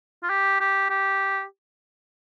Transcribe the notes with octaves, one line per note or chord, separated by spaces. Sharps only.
F4
G4
G4
G4